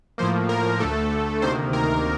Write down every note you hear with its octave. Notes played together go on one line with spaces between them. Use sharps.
A2 F3 A#3 C5
A#4
D2 D3 A3 A4
D2 C3 D#3 A#3 C5
A#4